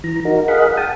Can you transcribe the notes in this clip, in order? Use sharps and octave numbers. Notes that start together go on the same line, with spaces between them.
E3 A#5
D#4 F#4 A#4
G#4 A#4 D#5 F5 F#5 B5
F#5 G5 A5 D#6